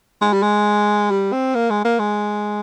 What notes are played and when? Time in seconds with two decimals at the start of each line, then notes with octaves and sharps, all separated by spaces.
0.21 G#3
0.33 G3
0.42 G#3
1.11 G3
1.32 C4
1.55 A#3
1.70 G#3
1.85 A#3
1.99 G#3